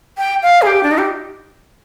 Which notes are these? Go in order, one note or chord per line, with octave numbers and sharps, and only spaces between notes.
G5
F5
G#4
G4
D4
D#4
G4